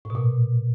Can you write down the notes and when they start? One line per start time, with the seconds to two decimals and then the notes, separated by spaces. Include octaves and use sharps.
0.05 A2
0.10 B2
0.15 A#2